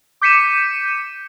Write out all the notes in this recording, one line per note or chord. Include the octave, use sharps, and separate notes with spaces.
D6 G6 B6 C#7 D#7 E7